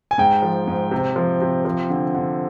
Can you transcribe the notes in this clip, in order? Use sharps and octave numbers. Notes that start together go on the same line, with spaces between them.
G#5
G#2 G5
F3
G#2
C3
F3
C3
F3
D3
D3